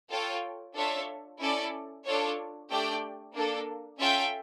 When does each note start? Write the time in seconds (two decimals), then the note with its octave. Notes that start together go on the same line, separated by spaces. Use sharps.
0.11 F4 A4 C#5 G5
0.75 D4 F4 A4 C#5 E5
1.41 C#4 E4 A4 D5
2.06 D4 F4 A4 C#5
2.70 A3 D4 G4 D5 G5
3.35 A#3 D4 A4
4.00 C#4 F4 A4 E5 G5